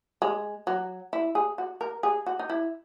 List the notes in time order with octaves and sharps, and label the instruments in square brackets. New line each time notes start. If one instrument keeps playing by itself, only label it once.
[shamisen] G#3
F#3
E4
G#4
F#4
A#4
G#4
F#4
D#4
E4